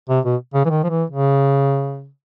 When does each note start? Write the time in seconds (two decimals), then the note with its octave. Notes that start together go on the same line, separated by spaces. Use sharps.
0.09 C3
0.25 B2
0.54 C#3
0.65 E3
0.70 D#3
0.83 F3
0.90 E3
1.10 C#3